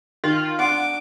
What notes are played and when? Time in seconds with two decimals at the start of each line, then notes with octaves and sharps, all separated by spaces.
0.24 D#3 F4
0.59 D4 F#5 D6